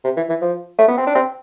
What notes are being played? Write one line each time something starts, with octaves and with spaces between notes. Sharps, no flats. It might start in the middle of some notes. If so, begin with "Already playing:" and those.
C3
E3
E3
F3
A3
B3
C4
D4
C4